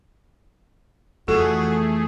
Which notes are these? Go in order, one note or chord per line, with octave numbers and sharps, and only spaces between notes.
F2 E3 A3 F#4 G#4 A4